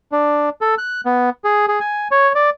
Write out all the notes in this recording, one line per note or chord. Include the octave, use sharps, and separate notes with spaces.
D4
A4
F#6
B3
G#4
G#4
G#5
C#5
D5